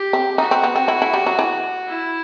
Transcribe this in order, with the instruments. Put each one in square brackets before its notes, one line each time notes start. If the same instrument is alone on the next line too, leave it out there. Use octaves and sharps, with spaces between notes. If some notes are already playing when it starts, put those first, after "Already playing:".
Already playing: [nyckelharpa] G4
[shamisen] C4
[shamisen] D#4 [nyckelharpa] F#4
[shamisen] C4
B3
C4
E4
E4
G3
F#3
E3
[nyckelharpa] E4